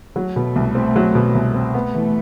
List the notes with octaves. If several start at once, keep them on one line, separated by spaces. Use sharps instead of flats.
F#3 A3
B2
C2
C4
F#3
B2
C2
C4
A3 B3
E3